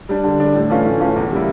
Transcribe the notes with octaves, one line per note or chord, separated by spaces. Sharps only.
G3 D4
D3
G3 D4
A2
E3 A3 C#4 F4
A2
E3 A3 C#4 F4
E2
C#3 G3 A#3 E4